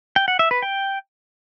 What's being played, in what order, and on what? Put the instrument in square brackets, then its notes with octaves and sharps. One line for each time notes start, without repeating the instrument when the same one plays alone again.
[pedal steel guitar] G5
F#5
E5
B4
G5